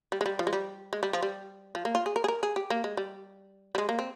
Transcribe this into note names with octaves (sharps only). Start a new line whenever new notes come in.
G3
G#3
G3
F3
G#3
G3
G#3
G3
F3
G3
F3
A#3
F4
G#4
A#4
G#4
A#4
G#4
G4
A#3
G#3
G3
G3
G#3
A#3
C4